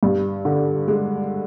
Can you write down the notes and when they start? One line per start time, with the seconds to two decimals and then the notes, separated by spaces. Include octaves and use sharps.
0.03 G2
0.45 D3
0.88 G#3